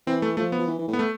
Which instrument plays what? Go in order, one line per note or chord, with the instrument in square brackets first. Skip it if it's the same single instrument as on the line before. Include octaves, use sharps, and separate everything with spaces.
[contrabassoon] E3 [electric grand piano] C4
[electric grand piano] A3
[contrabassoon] F3 [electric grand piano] A3
[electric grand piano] B3
[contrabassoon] F3
E3
E3
A2
[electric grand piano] B3
A3